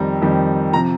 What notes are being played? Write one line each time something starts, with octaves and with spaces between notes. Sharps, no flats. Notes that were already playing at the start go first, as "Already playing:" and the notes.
Already playing: F2 D#3 G3 A#5
F2 D#3 G3
C3 F3 A#5